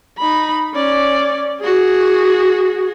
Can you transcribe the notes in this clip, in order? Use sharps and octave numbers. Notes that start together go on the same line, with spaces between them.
D#4 B5
C#4 D5
F#4 G#4